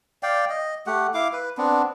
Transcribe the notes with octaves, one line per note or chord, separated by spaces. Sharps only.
D5 F5 G5
D#5
A3 G4 F#5
E4 F5 D6
B4
B3 C4 D4